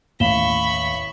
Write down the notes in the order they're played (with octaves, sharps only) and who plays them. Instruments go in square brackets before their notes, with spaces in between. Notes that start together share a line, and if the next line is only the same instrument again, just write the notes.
[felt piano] A1 [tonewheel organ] D#2 [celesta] F5 E7 G7 [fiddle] B5 C#6